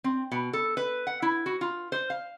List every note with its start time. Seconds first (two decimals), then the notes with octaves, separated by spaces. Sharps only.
0.04 C4
0.31 B2
0.53 A4
0.77 B4
1.07 F#5
1.22 E4
1.46 F#4
1.61 F4
1.92 C5
2.10 F5